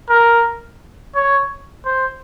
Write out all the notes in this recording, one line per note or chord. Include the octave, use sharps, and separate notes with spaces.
A#4
C#5
C5